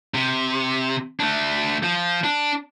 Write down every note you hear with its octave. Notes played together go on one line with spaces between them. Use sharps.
C3
A3 D4
F3
D4